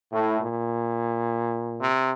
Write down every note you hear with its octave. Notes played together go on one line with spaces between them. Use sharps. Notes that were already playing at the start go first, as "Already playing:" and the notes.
A2
A#2
C3